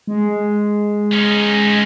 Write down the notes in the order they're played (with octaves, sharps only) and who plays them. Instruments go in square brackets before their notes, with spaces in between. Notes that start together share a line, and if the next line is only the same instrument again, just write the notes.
[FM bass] G#3
[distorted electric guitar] C#4 D#4